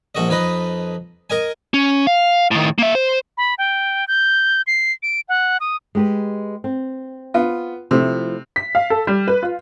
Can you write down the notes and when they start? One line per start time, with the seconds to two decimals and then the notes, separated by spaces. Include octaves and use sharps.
0.15 A#1 F#4 D#5
0.29 F2 D#4 B4 D#5
1.30 A#4 D#5 G#5
1.74 C#4
2.07 F5
2.51 A2 D#3
2.78 A#3 E5
2.95 C5
3.38 B5
3.58 G5
4.08 G6
4.67 C7
5.03 D7
5.29 F#5
5.60 D#6
5.95 G#3 G4 B4
6.64 C4
7.34 B3 F4
7.91 C3 F3 A3 E4
8.56 B6
8.75 F5
8.90 A4
9.07 G3
9.28 B4
9.43 F4